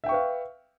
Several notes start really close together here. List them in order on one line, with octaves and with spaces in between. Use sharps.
E5 G5 C#6 B4 F5